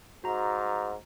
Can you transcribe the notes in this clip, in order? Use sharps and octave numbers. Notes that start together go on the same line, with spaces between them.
G#2 F#4 A#5